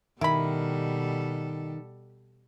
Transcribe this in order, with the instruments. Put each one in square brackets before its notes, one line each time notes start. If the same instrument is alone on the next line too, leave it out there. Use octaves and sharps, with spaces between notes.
[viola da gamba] B2 G3 A4 [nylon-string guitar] D#3 [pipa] E4 B5